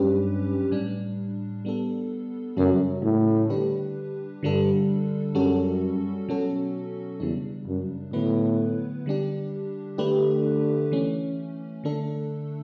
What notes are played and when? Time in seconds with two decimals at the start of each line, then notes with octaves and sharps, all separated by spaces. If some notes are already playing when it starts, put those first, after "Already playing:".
Already playing: G2 F#3 C#4 G4 B4
0.71 A2 G3 D4
1.65 G3 B3 D4 A4
2.57 F#2 C#3 G3 C#4 F#4 A4
3.03 A2
3.50 D3 G3 D4 G4 B4
4.43 G2 D3 G3 D4 A4
5.35 F#2 G3 C#4 F#4 A4
6.28 B2 F#3 C#4 F#4 A4
7.20 E2 C#3 G3 D4
7.67 F#2
8.13 A2 D3 F#3 B3 E4 B4
9.06 D3 G3 D4 G4
9.98 D3 A3 D4 G4 B4
10.92 E3 A3 C#4
11.84 D3 A3 D4 A4